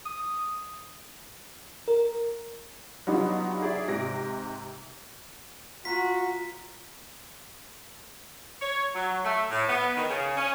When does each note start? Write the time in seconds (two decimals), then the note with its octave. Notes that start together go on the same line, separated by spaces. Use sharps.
0.05 D#6
1.88 A#4
3.07 F#3 G3 B3 D4 D#4 F4
3.62 G#4 D5 E5
3.87 G#2 C3 A#6 D7
5.85 F4 F#4 A#5 B6
8.61 C#5
8.95 F#3
9.24 A3
9.50 A2
9.68 B3
9.96 D#3
10.09 C#3
10.37 C#4